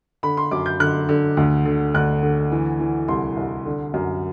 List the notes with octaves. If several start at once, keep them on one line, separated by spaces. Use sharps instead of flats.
D3 B5
C6
F#2 D6
G6
D3 F#6
D3
D2
D3
D2 F#6
D3
E3
E3
C2 C6
C2
D3
F#2